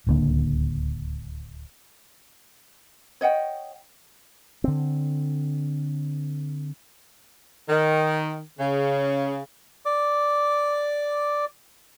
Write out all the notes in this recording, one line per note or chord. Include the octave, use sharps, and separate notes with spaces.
D1 C#2 D3 A#3
C#5 D#5 F#5 G5
D3 C4
D#3
C#3
D5 D6